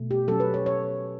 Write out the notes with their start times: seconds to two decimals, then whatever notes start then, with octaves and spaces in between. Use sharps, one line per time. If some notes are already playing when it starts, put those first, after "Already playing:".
Already playing: B2 A3
0.11 G4
0.28 F#3 C#4 A4
0.40 B4
0.54 C#5
0.66 C#5